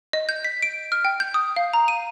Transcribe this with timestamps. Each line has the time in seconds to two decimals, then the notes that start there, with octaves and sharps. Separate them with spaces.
0.13 D#5
0.29 G6
0.44 B6
0.62 D7
0.92 F6
1.05 G5
1.20 G6
1.34 D#6
1.56 F5
1.73 A#5
1.88 D#7